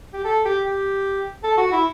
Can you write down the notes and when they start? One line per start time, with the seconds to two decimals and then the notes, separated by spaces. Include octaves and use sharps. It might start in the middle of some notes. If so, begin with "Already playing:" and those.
0.14 G4
0.25 A4
0.45 G4
0.65 G4
1.44 A4
1.58 F#4
1.72 E4